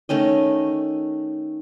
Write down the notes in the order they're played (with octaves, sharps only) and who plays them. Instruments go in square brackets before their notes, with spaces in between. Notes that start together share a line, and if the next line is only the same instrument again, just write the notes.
[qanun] D#3 A3 C#4 D#5